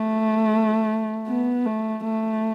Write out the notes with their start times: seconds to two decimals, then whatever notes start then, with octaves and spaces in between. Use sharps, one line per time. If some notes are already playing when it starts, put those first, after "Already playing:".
Already playing: A3
1.28 B3
1.66 A3
2.04 A3